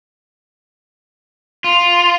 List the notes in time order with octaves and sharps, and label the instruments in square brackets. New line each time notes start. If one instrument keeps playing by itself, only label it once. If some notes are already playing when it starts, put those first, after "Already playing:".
[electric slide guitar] F4